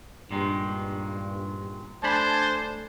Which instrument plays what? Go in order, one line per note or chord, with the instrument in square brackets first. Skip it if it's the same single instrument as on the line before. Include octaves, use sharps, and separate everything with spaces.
[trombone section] G2 [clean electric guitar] A#2 D#3 G#3
[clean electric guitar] A3 B5 [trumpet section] D4 G#5 A5 [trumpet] C5